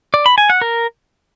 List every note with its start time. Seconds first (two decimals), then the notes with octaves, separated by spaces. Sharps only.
0.14 D5
0.26 B5
0.38 G#5
0.50 F#5
0.62 A#4